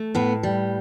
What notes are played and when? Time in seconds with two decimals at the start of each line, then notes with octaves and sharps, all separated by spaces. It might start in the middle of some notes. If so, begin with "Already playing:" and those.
Already playing: A3
0.15 A2 B3
0.43 G3